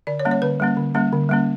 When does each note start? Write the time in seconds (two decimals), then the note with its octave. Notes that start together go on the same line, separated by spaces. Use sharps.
0.07 D3 D5
0.19 C#5
0.25 G3 A#3 C#4
0.31 C#5
0.42 D3 B4
0.60 G3 A#3 C#4
0.77 D3
0.95 G3 A#3 C#4
1.13 D3
1.29 G3 A#3 C#4